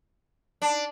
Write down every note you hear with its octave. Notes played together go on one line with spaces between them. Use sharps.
D4